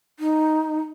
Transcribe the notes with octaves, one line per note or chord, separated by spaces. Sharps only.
D#4